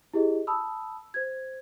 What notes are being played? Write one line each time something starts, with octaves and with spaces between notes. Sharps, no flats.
E4 G4 G#4 D#5
A5 B5 D#6 E6
C5 G#6